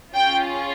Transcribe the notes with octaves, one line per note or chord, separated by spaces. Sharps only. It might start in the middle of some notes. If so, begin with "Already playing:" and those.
C#4 F4 G#4 G5